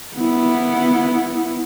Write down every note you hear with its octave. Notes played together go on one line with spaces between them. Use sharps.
B3 E4